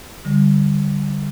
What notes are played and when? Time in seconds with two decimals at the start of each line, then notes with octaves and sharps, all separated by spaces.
0.25 D3 G3